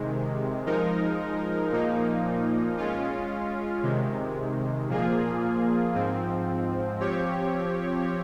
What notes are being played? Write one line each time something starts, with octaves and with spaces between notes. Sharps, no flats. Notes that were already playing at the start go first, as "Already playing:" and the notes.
Already playing: C3 D#3 G#3
F3 G#3 D#4 A#4
A#2 F3 A#3 D#4
G#3 C#4 F4
C3 D#3 G#3
A#2 F3 A#3 F4 G#4
G#2 F3 C4
F3 C4 G4 C#5